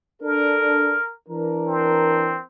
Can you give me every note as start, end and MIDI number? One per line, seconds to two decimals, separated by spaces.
0.22 0.96 62
0.22 0.96 69
0.22 1.12 70
1.28 2.37 52
1.28 2.37 62
1.28 2.37 70
1.67 2.43 60